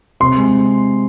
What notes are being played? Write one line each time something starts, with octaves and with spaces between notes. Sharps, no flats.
C3 C6
G#3